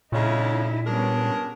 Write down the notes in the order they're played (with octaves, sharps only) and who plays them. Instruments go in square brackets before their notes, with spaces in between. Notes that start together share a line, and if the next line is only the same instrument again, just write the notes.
[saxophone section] F2 C#3 G#3 [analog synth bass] A#2 [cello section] D#4 E4
[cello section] G3 B3 C#4 [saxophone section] D4 G#4 A#4